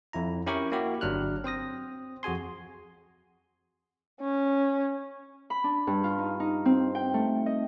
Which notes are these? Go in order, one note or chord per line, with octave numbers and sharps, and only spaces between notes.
F2 E4 A#5
C#4 E4 G4 A#4 G5 C#6
A#3 E4 F#4 G4
G1 F#3 D4 F6 F#6
C4 C5 D#6 A#6
F2 F#4 G#4 G#5 C6
C#4
B5
D4
G2
F4
D#4
D#4
C4
G5
A3
D#5